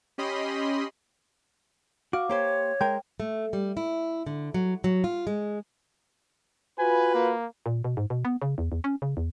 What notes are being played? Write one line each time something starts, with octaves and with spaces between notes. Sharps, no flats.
C#4 G4 D#5 B5 C6
F#4 F5 D6
A#3 G4 C5 C#5
G#3 A#4 G5
A3
G3
E4
D3
F#3
F#3
F4
G#3
F4 F#4 B4 G#5
A#3
A#2
B2
G#2
B2
B3
C#3
E2
E2
C#4
C#3
E2